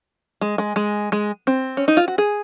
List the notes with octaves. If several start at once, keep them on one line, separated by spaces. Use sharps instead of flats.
G#3
G#3
G#3
G#3
C4
C#4
D#4
F4
F#4
G#4